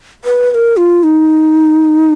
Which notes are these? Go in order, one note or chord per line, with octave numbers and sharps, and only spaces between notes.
B4
B4
A#4
F4
D#4